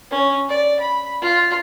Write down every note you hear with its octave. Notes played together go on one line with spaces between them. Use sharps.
C#4
D5
B5
F4